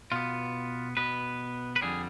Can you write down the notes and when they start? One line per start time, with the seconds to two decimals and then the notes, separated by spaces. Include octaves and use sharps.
0.12 B2 B3 F4
0.97 B2 B3 B4
1.76 B4
1.81 F2 D3 G3 G#4